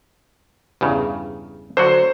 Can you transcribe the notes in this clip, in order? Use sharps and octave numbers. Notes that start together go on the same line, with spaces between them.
E2 G2 C#3
D3 F#3 F#4 C5